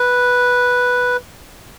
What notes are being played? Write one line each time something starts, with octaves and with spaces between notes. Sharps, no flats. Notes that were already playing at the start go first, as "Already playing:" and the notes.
Already playing: B4